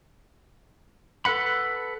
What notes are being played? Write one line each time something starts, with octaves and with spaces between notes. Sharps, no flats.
A4 B4 F#5 B5